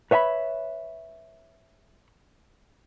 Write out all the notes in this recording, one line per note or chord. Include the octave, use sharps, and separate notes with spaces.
B4 C#5 E5 G#5 B5